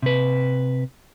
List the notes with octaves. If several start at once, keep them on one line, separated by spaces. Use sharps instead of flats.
C3 B4